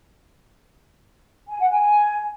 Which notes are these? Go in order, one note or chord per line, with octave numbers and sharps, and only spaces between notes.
G#5
F#5
G#5